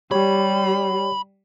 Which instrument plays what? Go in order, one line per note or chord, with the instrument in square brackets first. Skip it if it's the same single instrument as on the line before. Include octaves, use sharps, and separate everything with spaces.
[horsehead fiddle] G3 [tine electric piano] G4 C#5 [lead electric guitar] B5